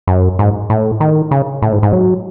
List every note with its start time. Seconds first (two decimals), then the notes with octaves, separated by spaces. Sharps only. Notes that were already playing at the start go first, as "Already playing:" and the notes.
0.07 F#2
0.39 G#2
0.70 A2
1.00 D#3
1.31 C#3
1.62 A2
1.72 G#2
1.83 G#2
1.93 F#3